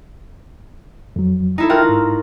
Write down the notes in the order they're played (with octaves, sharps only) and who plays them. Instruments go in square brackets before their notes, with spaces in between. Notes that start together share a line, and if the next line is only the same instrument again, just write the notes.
[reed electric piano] F2 F#3
[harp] D#4 E4 A4
[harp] F4 F#4 A#4 [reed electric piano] E5 G5 F6
[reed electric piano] G#2